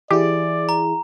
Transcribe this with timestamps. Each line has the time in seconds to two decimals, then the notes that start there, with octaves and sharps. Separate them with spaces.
0.11 E3 E4 G4 G#4 D5
0.69 A#5